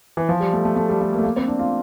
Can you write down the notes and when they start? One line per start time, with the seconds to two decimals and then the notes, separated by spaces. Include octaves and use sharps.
0.17 E3
0.29 F3
0.40 G3
0.53 A3
0.65 A3
0.76 A3
0.89 G3
1.01 A3
1.13 A#3
1.19 A3
1.23 A#3
1.36 C4
1.47 D4
1.59 F4